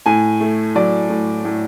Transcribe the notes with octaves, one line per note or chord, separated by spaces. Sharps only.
A2 G#5
A3
F#3 D5
A2
A2